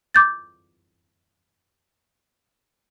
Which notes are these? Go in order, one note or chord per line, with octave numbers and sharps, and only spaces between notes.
D6 G6 A6